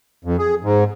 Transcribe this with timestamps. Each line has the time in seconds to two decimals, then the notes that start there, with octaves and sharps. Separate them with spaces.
0.25 F2
0.38 G#4
0.63 G#2